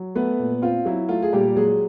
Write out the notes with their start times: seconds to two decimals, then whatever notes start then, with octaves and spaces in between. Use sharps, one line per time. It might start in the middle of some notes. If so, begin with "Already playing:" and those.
Already playing: F#3
0.15 A3 B3 B4
0.39 A#2
0.62 C4 F4
0.85 F#3 E4
1.09 A3 F4
1.23 G#4
1.33 A#2 G3 G4
1.55 F#3 G#3 G#4